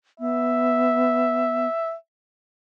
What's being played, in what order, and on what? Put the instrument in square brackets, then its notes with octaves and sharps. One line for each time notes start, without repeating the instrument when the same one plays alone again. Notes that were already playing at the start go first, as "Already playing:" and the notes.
[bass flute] B3 [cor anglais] E5